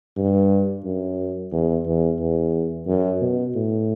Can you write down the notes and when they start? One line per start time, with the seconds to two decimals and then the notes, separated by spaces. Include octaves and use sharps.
0.17 G2
0.85 F#2
1.52 E2
1.86 E2
2.20 E2
2.87 F#2
3.21 B2
3.55 A2